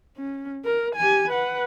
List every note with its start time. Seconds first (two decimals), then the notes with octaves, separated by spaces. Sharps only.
0.17 C#4
0.65 A#4
0.96 G4 G#5
1.29 B4 F#5